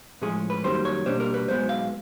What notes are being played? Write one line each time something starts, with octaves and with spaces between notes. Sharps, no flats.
A2 F3 G#3 C#4 G#4
B4
F#2 D#3 G3 A#3 C#4 C5
C#5
B2 G3 A#3 D4 C5
A#4
B4
B1 B2 G#3 B3 C5
F5